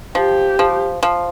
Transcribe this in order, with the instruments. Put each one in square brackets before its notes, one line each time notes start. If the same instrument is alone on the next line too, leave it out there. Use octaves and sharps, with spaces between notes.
[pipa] F3 [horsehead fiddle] G4
[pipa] F3
F3